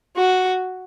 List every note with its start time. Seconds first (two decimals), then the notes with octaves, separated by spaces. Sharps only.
0.16 F#4